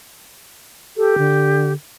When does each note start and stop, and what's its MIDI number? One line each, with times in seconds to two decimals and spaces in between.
0.97 1.73 67
0.97 1.16 69
1.18 1.74 50